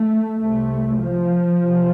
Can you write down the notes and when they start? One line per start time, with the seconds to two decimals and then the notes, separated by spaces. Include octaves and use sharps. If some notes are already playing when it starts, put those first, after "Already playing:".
Already playing: A3
0.38 C2 C3 A3
1.00 F3
1.62 C3